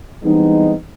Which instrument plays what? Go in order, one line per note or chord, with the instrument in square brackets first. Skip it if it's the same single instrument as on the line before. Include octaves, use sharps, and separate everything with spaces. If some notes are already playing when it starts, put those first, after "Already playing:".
[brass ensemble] E3 G3 G#3 B3 C4 D#4